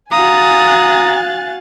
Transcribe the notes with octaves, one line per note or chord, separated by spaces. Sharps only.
F#4 F5 G#5 A#5 D#6 F#6 A6